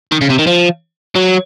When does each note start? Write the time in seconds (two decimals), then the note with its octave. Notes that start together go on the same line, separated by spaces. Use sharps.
0.12 D#3
0.21 C#3
0.30 C3
0.39 D#3
0.47 F3
1.16 F#3